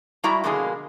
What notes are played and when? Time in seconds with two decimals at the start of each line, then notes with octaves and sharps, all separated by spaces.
0.24 G3 G#3 E4 F#4 E5 A#5
0.44 B2 D3 F3 G#3 A#3 G#4